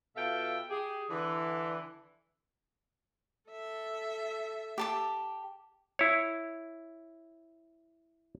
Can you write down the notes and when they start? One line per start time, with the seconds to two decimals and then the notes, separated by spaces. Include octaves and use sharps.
0.16 B2 F4 A4 E5 F5 G5
0.70 G4 G#4
1.10 D3 E3
3.50 A4 E5
4.78 G4 A5 D6
5.99 E4 C#5